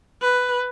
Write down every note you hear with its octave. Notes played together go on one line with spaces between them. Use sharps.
B4